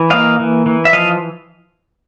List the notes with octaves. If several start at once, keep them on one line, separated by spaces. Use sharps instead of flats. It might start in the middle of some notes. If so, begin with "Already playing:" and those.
Already playing: E3
A#3 D#5 F5
E3
E3
E5
F3 D#5 F5